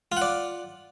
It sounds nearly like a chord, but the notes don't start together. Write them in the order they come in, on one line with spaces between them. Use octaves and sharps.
F4 F#5 D5